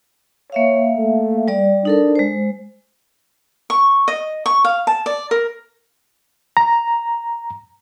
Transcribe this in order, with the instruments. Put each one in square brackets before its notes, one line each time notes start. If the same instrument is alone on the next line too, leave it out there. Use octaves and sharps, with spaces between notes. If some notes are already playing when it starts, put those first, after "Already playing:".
[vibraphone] A#3 E5 F5 [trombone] C#5
[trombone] A3
[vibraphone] G3 D5
[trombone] D4 [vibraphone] D#4 A4 A#4
[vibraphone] G#3 C5
[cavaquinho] C#6
D#5
C#6
F5
A5
D5
A#4
[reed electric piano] A#5